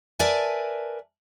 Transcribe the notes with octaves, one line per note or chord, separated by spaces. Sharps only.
A#4 B4 D5 E5 G#5 A5